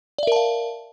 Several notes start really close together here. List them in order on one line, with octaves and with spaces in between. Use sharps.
D5 E5 A#4 A5 F5